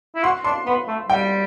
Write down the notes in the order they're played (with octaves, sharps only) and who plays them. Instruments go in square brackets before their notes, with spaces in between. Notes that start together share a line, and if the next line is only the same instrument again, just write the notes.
[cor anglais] E4
[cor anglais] F#4 [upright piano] C6
[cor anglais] D4 [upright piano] C6
[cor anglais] B3 [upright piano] B5
[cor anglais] A3
[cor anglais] G3 [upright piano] G5